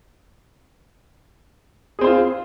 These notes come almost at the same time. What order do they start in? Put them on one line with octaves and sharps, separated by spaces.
G#4 C4 C5 F4